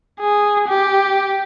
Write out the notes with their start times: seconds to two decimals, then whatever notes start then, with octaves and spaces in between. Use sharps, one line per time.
0.21 G#4
0.68 G4